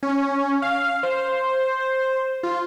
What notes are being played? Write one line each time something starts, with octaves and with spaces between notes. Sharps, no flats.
C#4
F5
C5
F4